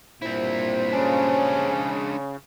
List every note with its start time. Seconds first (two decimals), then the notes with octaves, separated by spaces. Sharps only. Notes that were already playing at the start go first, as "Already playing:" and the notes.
0.22 G2 A#2 C4 E4 C5
0.93 C#3 G#3 C#4 D4